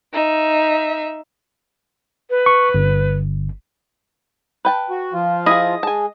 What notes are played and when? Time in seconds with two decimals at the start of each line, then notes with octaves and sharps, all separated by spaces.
0.13 D#4 E5
2.30 B4
2.46 C#6
2.74 G1
4.65 B4 G5 A5
4.90 F#4
5.13 F3 F4
5.46 E4 G#4 D#5
5.83 G#3 G#5 A5